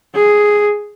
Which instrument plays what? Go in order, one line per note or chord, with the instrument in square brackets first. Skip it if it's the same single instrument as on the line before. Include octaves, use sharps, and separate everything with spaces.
[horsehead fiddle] G#4